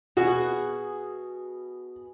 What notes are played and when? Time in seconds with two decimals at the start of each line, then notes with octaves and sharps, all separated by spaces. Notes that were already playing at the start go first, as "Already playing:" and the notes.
0.17 B2 F#4 G#4